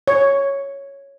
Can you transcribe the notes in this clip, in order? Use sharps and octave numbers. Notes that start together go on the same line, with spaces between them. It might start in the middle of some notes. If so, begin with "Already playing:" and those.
C#5